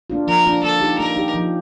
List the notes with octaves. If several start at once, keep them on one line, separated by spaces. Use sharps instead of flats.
A#3 D4 F4
F3 A#4
A#3 D4 F4
A#3 A4
D#4 G4
A#3 A#4
D#4 G4
F3